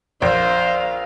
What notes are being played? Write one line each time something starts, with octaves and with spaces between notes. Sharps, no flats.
A#1 C5 F5